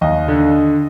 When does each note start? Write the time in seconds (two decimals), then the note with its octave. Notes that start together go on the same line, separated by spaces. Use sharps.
0.01 D#2 D#5
0.28 D3